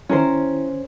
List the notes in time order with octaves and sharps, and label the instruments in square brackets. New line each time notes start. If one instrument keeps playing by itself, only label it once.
[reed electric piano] D#3 E4 [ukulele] C#4 A#4 C5